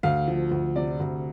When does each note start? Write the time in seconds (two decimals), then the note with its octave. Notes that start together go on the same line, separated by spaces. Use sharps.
0.03 D2 F5
0.28 F3
0.51 D2
0.76 C3 D5
1.00 D2